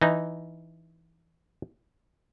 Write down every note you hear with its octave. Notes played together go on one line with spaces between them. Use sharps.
E3 D#4